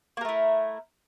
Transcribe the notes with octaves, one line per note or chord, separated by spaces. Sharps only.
A3 A#3 E4 A#4